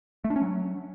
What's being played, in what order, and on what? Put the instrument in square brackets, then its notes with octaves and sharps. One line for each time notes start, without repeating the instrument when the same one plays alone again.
[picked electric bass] A3
D4
C#4
F#3